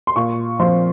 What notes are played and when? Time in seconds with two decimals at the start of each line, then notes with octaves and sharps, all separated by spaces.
0.07 C6
0.16 A#2 C#6
0.60 F3 C4 C6